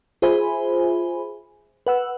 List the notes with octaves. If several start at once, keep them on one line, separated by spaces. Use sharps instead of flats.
F4 G#4 C5 E5 G#5 B5
B4 F#5 E6